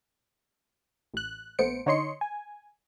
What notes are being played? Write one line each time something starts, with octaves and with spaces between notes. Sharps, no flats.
A1 F#6
A#1 A3 B3 C5 C#7 D7
D3 D#4 C#5 D#5 C6 C#7
G#5